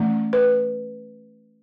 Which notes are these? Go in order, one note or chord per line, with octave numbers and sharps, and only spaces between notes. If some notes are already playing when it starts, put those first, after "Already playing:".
Already playing: E3 A3 C#4
B4